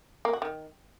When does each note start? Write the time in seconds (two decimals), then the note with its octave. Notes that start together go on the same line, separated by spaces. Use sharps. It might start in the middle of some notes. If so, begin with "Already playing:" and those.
0.25 A#3
0.33 F#4
0.42 D#3